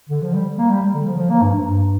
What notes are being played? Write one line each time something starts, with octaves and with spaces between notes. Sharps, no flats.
D3
F3
G3
A#3
G3
G3
D3
F3
F3
A#3
G2
G2